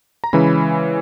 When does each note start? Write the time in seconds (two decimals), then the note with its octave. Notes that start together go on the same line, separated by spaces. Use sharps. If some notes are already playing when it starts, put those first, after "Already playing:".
0.24 A#5
0.33 C#3 E3 G#3 C#4 B5